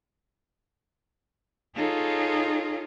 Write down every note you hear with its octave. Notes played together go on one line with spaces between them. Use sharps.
D#4 F4 G#4 A4 C#5 F5